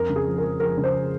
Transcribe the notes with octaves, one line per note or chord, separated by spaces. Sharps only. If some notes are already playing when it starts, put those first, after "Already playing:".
Already playing: F2 A#4
C#3
G#4
F3
A#4
F3
F3 A#4
C#3
C5